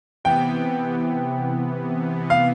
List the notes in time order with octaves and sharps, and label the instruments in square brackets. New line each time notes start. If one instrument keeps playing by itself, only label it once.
[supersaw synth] C3 E3 B3 [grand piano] G5
[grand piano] F5